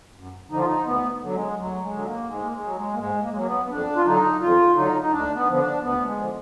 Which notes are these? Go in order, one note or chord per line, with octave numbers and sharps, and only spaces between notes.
F#2
D3 F3 D#4
F4
D#4
D2 B3
D3 F#3
G#3
D2 F#3
G#3
D3 F#3
A#3
G#2 G#3
A#3
G#3
F#3
G#3
A#3
G#2 G#3
A#3
G#3
F#3 A#3
B3
B3
F2 D4
F4
D3 F#3 D#4
F2 F4
D3 F#3 D#4
D#4
D2 D4
B3
D3 F3 B3
D4
D2 B3
G#3
D3 F3